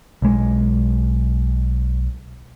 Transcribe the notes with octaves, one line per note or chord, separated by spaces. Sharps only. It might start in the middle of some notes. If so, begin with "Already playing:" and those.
B1 G#3